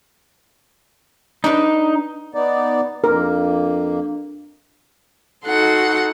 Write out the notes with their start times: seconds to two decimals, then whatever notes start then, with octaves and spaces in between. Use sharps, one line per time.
1.44 D4 D#4 B4
2.34 B3 D#4 D5
3.04 F2 A#3 D4 A#4
5.46 D#4 F#4 A4 F#5 C6